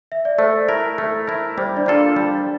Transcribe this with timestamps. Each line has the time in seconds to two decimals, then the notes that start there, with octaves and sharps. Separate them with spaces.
0.12 E5
0.25 D5
0.39 A3 C5
0.68 E4 A#4
0.98 A3
1.27 E4 A#4
1.58 G3 C5
1.76 D4 D5
1.86 A#3 F4 A4
2.16 G3